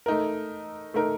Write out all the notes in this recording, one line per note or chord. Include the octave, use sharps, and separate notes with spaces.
A3 D#4 A#4
A3 D#4 A#4